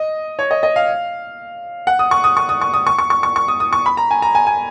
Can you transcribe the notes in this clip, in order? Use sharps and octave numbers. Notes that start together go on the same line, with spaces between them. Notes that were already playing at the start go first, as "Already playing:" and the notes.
Already playing: D#5
C#5
D#5
D#5
F5
F#5
D#6
C#6
D#6
C#6
D#6
C#6
D#6
C#6
C#6
C#6
C#6
C#6
D#6
D#6
C#6
B5
A#5
G#5
A#5
G#5
G#5